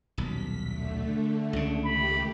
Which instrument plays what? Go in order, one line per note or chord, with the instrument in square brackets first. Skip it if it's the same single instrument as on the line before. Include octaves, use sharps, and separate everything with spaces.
[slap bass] D#1 B1 [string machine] B6
[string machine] D3 A3
[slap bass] C#2 C#3
[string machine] D#3 A3 G4 [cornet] B5